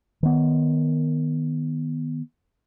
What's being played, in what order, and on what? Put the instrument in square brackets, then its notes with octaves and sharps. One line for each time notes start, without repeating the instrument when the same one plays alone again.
[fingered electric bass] D#3 B3